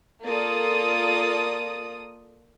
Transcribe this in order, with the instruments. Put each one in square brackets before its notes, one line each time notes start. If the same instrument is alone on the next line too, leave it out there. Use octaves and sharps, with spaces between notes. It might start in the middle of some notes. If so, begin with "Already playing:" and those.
[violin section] A#3 F4 A4 D5 D#6